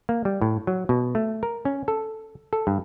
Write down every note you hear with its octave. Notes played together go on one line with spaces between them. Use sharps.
A#3
G3
A2
F#3
B2
A3
A#4
C#4
A4
A4
G2